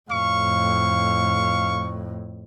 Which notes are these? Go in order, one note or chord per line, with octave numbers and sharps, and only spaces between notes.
F2 A2 F5 C#6